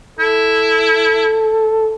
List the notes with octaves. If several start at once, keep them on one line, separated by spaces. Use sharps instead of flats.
E4 A4